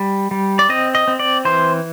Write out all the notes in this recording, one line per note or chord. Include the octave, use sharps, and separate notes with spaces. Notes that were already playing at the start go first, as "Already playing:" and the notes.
Already playing: G3
G3
D5
C4 D#5
D#5
C4
D5
E3 C5